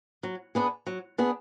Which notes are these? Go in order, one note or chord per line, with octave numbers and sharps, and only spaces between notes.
F#3
B3 D4 G#4
F#3
B3 D4 G#4